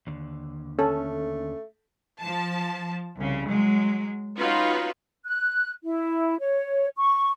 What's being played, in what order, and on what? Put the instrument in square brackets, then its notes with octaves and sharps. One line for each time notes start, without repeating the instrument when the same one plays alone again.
[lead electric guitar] D#2 D3
[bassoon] A3 [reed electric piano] C#4 [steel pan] A4
[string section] F3 A5
C2 C#3
F#3 G#3
C#4 D#4 F4 F#4 B4
[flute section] F#6
E4
C#5
C#6